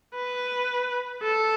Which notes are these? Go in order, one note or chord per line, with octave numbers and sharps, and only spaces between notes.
B4
A4